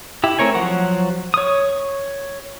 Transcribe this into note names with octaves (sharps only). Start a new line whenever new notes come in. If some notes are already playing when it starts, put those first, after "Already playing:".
E4 G4
A3 C4 A#4 C#5 G#5
F3 F#3 F#5 C#6
C#5 D#6